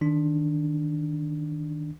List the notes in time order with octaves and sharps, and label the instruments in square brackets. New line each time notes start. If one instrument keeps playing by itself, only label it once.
[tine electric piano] D#3 D4